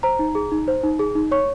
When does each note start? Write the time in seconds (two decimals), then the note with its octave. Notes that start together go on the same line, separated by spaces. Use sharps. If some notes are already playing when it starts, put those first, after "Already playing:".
0.03 C5 A#5
0.19 D#4
0.35 G#4
0.51 D#4
0.68 C5
0.83 D#4
0.99 G#4
1.15 D#4
1.31 C#5 C#6